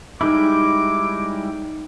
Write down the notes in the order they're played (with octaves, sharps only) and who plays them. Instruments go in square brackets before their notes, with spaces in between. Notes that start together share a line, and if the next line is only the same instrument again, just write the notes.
[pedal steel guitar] G3 G#3 E4 [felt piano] D#4 [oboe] D6